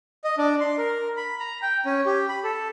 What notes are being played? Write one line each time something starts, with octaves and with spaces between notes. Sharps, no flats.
D#5
D4
C6
A#4
B5
A#5
G5
C#4
G4
B5
A4